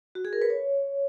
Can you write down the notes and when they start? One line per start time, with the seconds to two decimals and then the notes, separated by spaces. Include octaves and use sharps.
0.15 F#4
0.25 G#4
0.33 A#4
0.42 B4
0.50 C#5